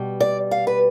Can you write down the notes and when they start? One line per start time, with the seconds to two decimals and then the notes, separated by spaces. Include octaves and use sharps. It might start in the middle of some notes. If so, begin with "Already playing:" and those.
Already playing: B2 G3
0.20 D5
0.51 F5
0.67 B4